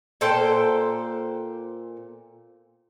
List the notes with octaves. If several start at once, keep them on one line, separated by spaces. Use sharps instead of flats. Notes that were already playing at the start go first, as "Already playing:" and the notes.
A#2 A4 C5 G5